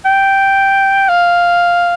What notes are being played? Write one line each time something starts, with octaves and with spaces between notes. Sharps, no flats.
G5
F5